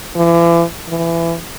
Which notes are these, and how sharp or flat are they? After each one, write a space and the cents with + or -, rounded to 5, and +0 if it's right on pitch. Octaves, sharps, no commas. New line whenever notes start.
E3 +40
E3 +25